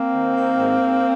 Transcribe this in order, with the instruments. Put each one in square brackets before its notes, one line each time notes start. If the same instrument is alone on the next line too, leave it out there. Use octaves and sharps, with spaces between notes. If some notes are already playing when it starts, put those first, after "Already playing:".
Already playing: [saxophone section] A#3 C4
D#3
D#3
G#2
G#2